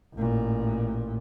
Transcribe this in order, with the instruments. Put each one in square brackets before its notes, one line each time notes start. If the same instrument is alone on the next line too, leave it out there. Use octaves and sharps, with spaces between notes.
[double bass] A1 A#2